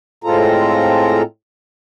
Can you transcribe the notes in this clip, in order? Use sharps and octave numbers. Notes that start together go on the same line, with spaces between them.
A2 G#3 C4 F4 A4 A#5